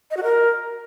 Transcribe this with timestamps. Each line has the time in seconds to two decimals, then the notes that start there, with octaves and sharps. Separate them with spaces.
0.11 D#5
0.17 F#4
0.23 A#4